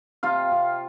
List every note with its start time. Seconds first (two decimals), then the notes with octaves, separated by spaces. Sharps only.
0.23 C3 F4 F5
0.51 C3